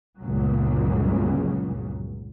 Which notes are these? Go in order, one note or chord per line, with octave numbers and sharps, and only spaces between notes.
G1 C#2 A#2 C#3 F#3